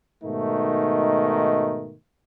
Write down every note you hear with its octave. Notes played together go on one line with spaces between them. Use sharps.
G#2 B2 D#3 A3 D#4